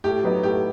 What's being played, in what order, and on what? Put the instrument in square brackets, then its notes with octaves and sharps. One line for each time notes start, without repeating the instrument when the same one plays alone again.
[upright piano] A2 [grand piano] G4
[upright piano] F#3 B3 D#4
[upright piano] A2 [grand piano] G4